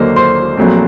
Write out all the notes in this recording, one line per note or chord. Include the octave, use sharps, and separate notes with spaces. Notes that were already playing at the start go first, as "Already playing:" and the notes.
Already playing: D#2 D3 F#3 A#3 C5
C5 C6
A#1 A#2 F#3 A3 C4